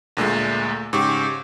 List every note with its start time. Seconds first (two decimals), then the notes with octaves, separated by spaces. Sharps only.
0.17 D2 A#2 G#3 A3
0.93 G#2 C#3 G4 C#6